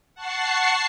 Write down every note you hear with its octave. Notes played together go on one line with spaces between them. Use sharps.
F#5 A5 C#6 C7